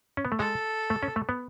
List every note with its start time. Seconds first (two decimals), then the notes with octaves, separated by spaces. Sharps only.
0.17 C#4
0.25 B3
0.32 A3
0.39 G#3 A4
0.90 A3
1.03 C#4
1.16 A3
1.29 B3